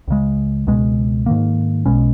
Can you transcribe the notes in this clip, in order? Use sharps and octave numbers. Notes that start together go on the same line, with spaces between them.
C#2 C#3 G#3
C#2 B2 G#3
G#2 D#3 A#3
B1 B2 G#3 C#4